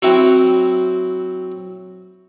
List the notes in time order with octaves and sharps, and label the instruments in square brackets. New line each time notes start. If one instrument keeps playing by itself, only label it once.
[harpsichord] F#3 C4 E4 F#4